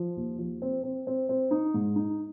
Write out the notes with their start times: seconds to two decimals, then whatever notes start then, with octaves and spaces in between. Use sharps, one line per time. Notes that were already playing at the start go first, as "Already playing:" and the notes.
Already playing: F3
0.16 D#2
0.38 F3
0.62 C4
0.83 C4
1.07 C4
1.29 C4
1.51 D#4
1.74 G#2
1.96 D#4